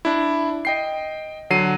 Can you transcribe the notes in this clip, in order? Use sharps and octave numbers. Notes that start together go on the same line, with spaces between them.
D4 E4
D#5 G5 C7
D3 F#3 C7 D#7